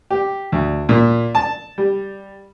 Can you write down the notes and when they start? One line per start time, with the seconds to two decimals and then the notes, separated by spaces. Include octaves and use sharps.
0.11 G4
0.52 D2
0.89 A#2
1.35 A5
1.78 G3